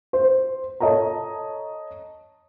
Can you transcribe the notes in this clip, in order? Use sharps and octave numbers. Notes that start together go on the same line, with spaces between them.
C5
A4 C#5 D#5 A5 A#5